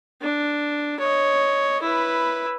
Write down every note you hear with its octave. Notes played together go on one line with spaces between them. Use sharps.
D4
C#5 D#5
E4 B4